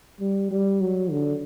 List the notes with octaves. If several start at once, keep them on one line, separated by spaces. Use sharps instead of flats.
G3
G3
F#3
D3